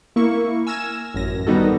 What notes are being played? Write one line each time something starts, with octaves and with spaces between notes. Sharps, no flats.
A#3 E4 C#6
G#5 E6 F6 G#6 A#6 E7
A1 F#2 A#6
D#3 G3 B3 D#4 F#4 A4